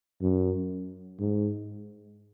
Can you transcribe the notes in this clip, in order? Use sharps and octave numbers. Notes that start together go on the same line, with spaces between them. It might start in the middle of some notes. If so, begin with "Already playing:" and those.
F#2
G#2